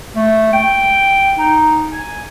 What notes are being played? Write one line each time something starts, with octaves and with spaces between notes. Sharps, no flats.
A3
G5
D#4
G#5